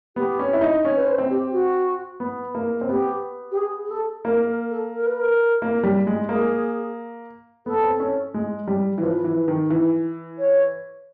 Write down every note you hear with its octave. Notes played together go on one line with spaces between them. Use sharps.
B3 G4
C#4
E4
D#4
C#4 C#5
B4
C5
C4
G4
F#4
B3
A#3
C4
B3 G4
G4
G#4
G#4
A4
A#3 A#4
A#4
A4
A#4
B4
A#4
A#3
G3
G#3
A#3 G#4
B3 A4
C4
C#4
G#3
G3
E3
F3 B4
E3
D#3
E3
C#5